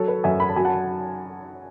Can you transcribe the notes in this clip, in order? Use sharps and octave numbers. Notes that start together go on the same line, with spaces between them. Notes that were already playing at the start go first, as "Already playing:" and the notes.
Already playing: F#3 A4 C#5
B4
F#2 E5 G#5
B5
A5
F#3 G#5
F#5 A5